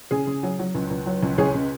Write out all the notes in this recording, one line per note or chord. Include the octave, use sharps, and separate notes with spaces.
C#3 G#4
C#3
F#3
F#3
C#2
C#2
F#3
C#2
C#2 G#4 C#5
C#3